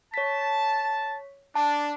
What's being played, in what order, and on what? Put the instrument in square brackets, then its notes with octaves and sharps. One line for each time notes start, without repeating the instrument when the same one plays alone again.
[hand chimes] C#5 B6 [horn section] A5
[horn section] D4 [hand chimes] A5